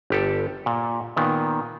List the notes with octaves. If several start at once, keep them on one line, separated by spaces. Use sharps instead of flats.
G1 G4 A4
A#2
A#2 D#3 B3